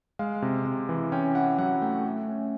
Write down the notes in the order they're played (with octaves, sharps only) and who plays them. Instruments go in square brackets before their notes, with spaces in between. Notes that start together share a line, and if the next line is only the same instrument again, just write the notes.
[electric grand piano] G#3 F5
C3
C3
E3
C#4 G5
E4 F#5
F#3 F#5
A3 G5
A3
C#4